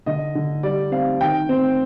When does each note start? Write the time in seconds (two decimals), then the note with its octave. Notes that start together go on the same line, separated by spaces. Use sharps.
0.06 D3 D#5
0.35 D3
0.63 G3 D5
0.92 C4 F5
1.20 D#3 G5
1.49 C4